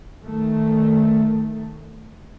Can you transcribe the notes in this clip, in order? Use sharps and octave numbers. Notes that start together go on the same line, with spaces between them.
D#3 A3